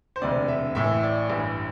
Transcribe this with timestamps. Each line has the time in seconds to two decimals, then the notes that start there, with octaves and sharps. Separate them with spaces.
0.16 C5
0.22 E1 D2 C3 D5
0.48 E5
0.75 A1 A2 E3 E5
1.03 D5
1.30 A1 G2 E3